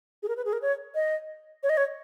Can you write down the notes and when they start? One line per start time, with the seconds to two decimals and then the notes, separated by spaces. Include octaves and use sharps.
0.23 G#4
0.28 A#4
0.37 B4
0.45 G#4
0.53 A#4
0.62 C#5
0.95 D#5
1.63 C#5
1.69 D#5
1.77 C#5